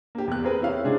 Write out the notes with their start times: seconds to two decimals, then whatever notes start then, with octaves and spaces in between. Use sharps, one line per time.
0.15 A#3 G4
0.27 E2 F#6
0.44 C4 G#4 A#4 B4
0.62 E4 G4 C#5 E5 F5
0.84 C#3 G#3 D4 G#4 C5